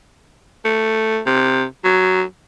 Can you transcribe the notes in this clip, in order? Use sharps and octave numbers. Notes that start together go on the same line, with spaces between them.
A3
C3
F#3